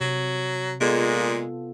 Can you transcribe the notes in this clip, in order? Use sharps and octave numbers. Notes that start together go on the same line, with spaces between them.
C3 F#3
A#2 G#3 B3 F4 A4